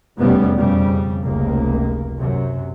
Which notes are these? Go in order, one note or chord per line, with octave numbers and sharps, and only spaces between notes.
F1 E2 B2 G3 B3 C#4
F2 C#3 G3
F1 C#2 A#3
F#2 C3